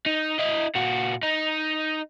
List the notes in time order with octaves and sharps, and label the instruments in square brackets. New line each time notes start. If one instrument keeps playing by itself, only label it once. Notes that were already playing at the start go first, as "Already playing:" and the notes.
[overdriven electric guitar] D#4
E4 D#5
A#2 F#4
D#4